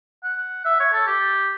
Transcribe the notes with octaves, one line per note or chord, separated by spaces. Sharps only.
F#5
E5
C#5
A4
G4